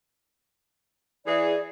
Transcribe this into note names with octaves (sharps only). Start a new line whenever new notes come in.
E3 G#4 D5